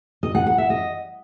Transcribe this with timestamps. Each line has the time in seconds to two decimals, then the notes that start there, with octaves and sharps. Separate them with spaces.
0.23 D#5
0.35 F#5
0.46 F#5
0.58 E5
0.70 D#5